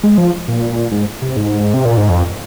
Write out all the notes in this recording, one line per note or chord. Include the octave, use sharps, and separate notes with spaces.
G#3
F3
A#2
G#2
C3
G#2
C3
A#2
G#2
F2